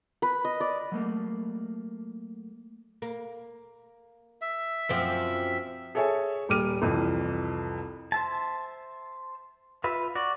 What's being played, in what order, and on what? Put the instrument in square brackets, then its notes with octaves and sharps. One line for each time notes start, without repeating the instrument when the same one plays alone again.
[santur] B4
D#5
D5
[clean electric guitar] F#3 A3 A#3
[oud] A#3
[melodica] E5
[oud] F#2 F3 C4
[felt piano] G#4 A4 C#5 E5 G#5
D#1 G3 D6 F6 D#7
C2 F2 E3
[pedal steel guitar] C5 E5 A5
F4 B4 E5
F#4 D5